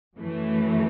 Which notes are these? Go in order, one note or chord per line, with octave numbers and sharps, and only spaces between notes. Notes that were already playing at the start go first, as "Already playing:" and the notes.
F#2 E3 A3